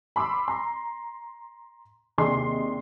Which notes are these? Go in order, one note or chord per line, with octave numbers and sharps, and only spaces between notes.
B5 C6 D6 E6
A#5 C6
D#2 C3 D4 G#4 D#5 C6